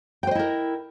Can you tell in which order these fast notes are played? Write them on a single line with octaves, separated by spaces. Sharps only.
G5 C5 D#5 E4 A#4